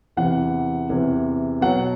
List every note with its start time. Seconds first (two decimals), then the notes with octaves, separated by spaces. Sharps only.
0.17 E2 C3 E3 F#5
0.89 E2 C3 E3
1.61 B2 F#3 F#5